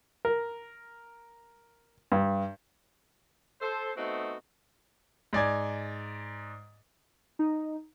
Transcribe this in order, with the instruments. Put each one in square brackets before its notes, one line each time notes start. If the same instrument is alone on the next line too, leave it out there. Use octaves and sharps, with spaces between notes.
[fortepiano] A#4
G2
[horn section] A4 C5
A3 B3 C4 D#4 F#4
[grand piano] G#2 D5 G#5 G#6
[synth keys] D#4